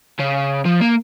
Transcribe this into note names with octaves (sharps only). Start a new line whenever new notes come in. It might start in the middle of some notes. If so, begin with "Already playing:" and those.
C#3
F3
A#3